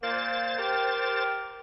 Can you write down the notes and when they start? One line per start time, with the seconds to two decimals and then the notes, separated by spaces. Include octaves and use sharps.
0.03 A#2 A#3 C5 A6
0.59 G4 A#4